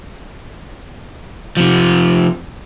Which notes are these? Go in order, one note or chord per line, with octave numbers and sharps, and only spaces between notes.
C3 F3